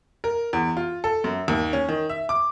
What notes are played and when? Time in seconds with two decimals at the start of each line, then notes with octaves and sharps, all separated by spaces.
0.24 A#4
0.53 E2
0.77 F4
1.04 A4
1.24 F#2
1.48 D#2
1.73 C#4
1.88 D#3
2.10 E5
2.29 D6